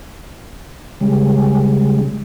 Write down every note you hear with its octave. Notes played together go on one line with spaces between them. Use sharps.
C#3 G3 G#3